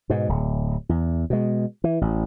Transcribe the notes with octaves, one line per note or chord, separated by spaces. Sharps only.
G#2 B2
D1
E2
B2 G#3
E3
A1